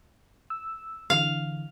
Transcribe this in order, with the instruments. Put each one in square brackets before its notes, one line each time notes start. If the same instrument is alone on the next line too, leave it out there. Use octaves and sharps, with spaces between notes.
[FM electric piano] E6
[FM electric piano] D3 E3 [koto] F5